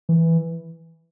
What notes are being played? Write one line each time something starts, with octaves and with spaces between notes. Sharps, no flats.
E3